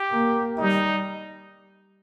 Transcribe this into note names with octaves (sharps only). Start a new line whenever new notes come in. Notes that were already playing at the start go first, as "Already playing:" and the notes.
Already playing: G4
A#3
G3 D#4